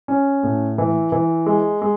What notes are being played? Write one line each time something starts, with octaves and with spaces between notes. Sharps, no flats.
C#4
A2
E3
E3
G#3
G#3